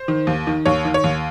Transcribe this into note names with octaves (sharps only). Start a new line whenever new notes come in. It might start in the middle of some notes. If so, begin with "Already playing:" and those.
Already playing: C5
D#3
D#2
D#3
D#2 C#5
D#3
C#5
D#2